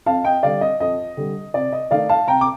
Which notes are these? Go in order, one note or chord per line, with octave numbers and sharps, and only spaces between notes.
F2 F5 A5
D#5 G5
D3 G3 D5 F5
D#5
F2 D#5
D3 G3
C3 D5
D#5
D#3 A3 D#4 D5 F5
F5 A5
C3 G5 A#5
D6